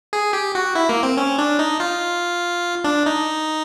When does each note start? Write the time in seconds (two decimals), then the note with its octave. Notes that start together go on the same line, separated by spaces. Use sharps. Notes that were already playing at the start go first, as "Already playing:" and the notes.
0.13 G#4
0.33 G4
0.55 F#4
0.75 E4
0.89 A#3
1.03 C4
1.17 C#4
1.38 D4
1.59 D#4
1.80 F4
2.84 D4
3.06 D#4